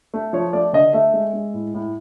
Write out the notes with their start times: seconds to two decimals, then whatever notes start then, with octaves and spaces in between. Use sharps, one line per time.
0.14 A3
0.33 F3 C#5
0.53 A3 D5
0.73 D3 D#5
0.93 A3 E5
1.14 G#3
1.33 G#3
1.54 A2
1.74 A2